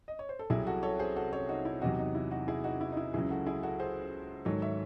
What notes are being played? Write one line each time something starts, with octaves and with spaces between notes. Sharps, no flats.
D#5
C#5
C5
A4
C2 C3 F#3 E4 G#4
F#4 A4
A4 C#5
G#4 C5
F#4 A4
A4 C#5
D#4 F#4
E4
E2 C3 F#3 D#4 F#4
D#4
E4
D#4 F#4
E4 G#4
D#4 F#4
E4
D#4
E4
C#2 C#3 F#3 E4 G#4
F#4 A4
E4 G#4
F#4 A4
G#4 C5
G#2 D#3 F#3 A4 C#5
C#5 E5